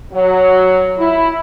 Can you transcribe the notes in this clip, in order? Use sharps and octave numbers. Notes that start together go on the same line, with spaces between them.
F#3
E4